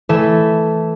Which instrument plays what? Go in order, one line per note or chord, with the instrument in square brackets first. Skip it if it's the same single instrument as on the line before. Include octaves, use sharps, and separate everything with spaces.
[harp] E3 A3 A4 E5